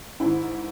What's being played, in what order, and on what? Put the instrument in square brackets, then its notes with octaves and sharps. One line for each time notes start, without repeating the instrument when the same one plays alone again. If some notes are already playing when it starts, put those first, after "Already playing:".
[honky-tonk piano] G#2 D#3 E4